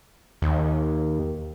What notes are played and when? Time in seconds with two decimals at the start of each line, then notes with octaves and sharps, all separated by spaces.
0.42 D#2